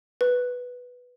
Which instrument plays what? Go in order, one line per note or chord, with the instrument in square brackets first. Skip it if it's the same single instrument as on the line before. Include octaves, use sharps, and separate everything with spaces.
[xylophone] B4